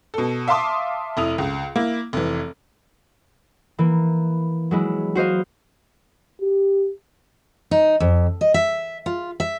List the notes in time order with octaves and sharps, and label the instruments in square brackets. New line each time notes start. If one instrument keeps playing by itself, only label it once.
[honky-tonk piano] B2 A4
E5 F5 A5 C6 D6 D#6
F1 E4 D#6 F7
C#2
A#3 E4
F1 E3
[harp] E3 A#3
F#3 G#3 E4
F#4 C5 D#5 F5
[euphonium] G4
[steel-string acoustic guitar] D#4
F2
D#5
E5
F4
E5